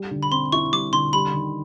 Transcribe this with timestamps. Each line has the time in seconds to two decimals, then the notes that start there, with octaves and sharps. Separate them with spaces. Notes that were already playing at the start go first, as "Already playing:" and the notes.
Already playing: G3
0.11 D3
0.23 B5
0.31 C4 C6
0.52 E4 C#6
0.73 G3 D6
0.93 D3 C6
1.13 G3 B5
1.34 D#3